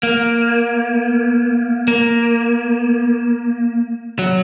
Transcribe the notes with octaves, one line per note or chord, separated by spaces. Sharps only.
A#3
A#3
F#3